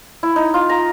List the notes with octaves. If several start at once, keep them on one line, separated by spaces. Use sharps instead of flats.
E4
D#4
F4
A#5